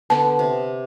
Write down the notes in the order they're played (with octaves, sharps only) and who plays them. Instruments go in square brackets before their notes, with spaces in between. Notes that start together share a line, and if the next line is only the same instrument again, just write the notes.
[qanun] D3 B3 [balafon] A5
[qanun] C3